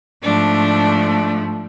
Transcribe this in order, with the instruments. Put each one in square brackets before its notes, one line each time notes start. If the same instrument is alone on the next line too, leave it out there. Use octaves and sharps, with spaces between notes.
[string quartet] G#2 F3 A3 D4